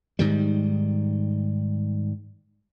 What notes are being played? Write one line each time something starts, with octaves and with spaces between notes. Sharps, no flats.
G#2 D#3 G3